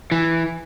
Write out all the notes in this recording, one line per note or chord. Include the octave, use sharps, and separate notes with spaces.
E3